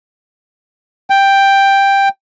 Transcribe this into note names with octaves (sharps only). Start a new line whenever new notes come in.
G5